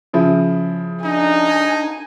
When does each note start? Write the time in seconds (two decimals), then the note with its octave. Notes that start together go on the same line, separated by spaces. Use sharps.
0.13 C#3 F3 E4
1.04 D4 D#4 G#5